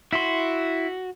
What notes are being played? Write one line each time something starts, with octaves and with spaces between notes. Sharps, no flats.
E4 F#4 C6